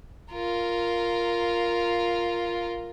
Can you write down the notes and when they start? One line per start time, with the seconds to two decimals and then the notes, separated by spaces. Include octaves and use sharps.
0.33 F4 A#4